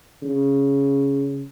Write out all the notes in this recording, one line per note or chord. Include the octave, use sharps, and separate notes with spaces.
C#3